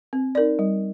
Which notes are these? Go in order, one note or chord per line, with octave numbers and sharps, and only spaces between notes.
C4
D#4 A#4 D5
G3